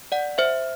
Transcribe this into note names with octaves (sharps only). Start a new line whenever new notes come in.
D5 F#5
C5 E5